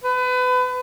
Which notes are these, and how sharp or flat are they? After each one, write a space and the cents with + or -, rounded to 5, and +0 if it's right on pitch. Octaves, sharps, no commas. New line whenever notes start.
B4 +30